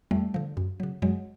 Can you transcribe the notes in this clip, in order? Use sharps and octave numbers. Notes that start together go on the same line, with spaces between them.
F2 G3 A3
D3 F3
F#2
C#3 F#3
F#2 F#3 G#3